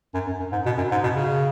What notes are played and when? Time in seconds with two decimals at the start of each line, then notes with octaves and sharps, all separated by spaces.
0.14 F#2
0.27 F#2
0.40 F#2
0.52 G#2
0.66 B2
0.78 F#2
0.91 G#2
1.03 B2
1.16 C#3